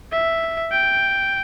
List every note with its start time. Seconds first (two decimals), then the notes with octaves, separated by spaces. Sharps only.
0.12 E5
0.72 G5